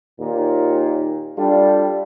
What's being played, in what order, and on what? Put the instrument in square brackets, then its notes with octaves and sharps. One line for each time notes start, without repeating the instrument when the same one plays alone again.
[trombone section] D#2 A#2
G3 D4 F4 A4